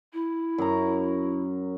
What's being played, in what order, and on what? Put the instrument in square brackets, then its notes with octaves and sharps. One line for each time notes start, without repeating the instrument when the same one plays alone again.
[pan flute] E4
[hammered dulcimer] F#2 A#5